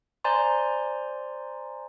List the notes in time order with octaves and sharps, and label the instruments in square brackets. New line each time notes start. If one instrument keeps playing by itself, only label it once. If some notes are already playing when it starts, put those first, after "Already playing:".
[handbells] C5 D5 G#5 A#5 C6